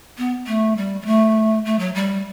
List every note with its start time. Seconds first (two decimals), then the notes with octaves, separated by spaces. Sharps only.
0.18 B3
0.47 A3
0.77 G3
1.02 G3
1.06 A3
1.65 A3
1.79 F#3
1.94 G3